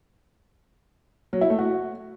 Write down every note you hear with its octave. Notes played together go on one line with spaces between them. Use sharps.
F#3
E4
A3
F#4